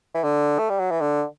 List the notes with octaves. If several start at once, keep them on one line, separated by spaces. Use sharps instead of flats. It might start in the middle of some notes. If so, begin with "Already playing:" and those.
E3
D3
A3
G3
F#3
E3
D3